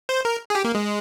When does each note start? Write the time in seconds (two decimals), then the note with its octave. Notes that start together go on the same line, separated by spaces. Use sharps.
0.09 C5
0.25 A#4
0.50 G#4
0.55 G4
0.64 A#3
0.75 G#3